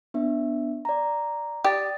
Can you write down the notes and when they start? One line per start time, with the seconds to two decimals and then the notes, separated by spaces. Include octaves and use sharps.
0.14 B3 D4 E5
0.85 D5 A#5
1.64 G4 D5 D#6 A6